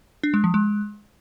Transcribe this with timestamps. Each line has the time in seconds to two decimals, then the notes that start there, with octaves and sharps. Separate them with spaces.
0.23 D4
0.34 G#3
0.44 F3
0.54 G#3